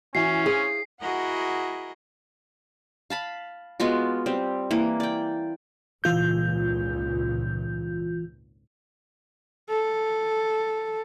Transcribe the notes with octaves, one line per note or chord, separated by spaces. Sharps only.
E3 C#4 F#4 C7
G#4 C5 C#5 F5
E4 F#4 G#4 A#4 D#5 F#5
F5 A5 B5
G#3 B3 F4 F#4
G3 C4
E3 A#3
D5 G5
G#1 C#2 A#2 E3 F4 G6
A4